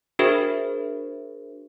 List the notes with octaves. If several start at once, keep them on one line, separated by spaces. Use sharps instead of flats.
D4 F#4 G#4 A#4 C5 E5